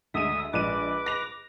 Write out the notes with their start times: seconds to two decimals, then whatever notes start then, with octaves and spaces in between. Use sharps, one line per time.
0.14 D2 G#3 E5 D#6 D#7
0.53 A#1 G#3 B4 D6 D#7
1.06 A#6 F7